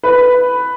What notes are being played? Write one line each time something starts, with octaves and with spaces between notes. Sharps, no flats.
B4